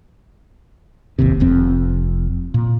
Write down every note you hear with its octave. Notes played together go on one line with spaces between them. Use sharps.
E1 A1 D#2 C3
F1 F2 C4
A#2